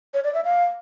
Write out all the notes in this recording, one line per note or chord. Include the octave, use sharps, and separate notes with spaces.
C#5
D5
E5
F5